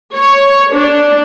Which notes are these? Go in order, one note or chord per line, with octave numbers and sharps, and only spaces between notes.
C#5
D4